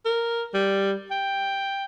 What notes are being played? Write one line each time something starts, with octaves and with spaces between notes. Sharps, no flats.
A#4
G3
G5